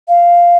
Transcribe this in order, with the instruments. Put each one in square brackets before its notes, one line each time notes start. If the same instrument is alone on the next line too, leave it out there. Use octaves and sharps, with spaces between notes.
[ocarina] F5